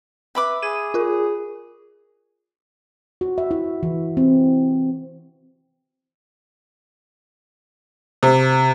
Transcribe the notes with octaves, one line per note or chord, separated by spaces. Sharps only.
B4 E5 B5 D6
G#4 G#6 D#7
F4 A#4
F#4
E5
E4
E3
C4
C3